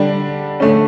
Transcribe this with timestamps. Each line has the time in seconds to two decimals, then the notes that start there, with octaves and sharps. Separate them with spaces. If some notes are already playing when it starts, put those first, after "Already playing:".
Already playing: D3 G3 D4
0.60 D3 A3 C#4